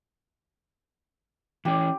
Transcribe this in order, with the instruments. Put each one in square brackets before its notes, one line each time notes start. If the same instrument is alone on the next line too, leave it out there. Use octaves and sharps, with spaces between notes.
[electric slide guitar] E3 C#4 [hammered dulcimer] G4